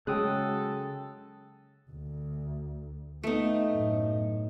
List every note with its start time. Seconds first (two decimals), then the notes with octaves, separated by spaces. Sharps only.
0.07 C#3 F#3 G#3 A4 G5 D#6 F#6
1.90 D2
3.23 A3 B3 D#4
3.71 F#2 A2